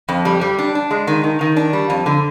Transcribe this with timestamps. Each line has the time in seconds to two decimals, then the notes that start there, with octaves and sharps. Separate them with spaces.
0.09 F2
0.25 G3
0.41 G3
0.59 D4
0.75 D4
0.91 G#3
1.07 D#3
1.24 D#3
1.41 D#3
1.56 D4
1.73 G3
1.90 F2
2.06 D3